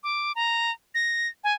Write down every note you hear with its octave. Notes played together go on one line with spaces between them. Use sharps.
D6
A#5
A#6
G#5